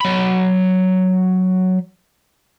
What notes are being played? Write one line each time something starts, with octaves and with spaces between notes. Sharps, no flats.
F#3 B5